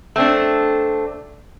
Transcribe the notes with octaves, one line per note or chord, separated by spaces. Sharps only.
A3 C4 D4